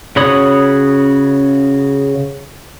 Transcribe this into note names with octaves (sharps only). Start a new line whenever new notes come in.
C#3 F#4 C#5 B5 D#6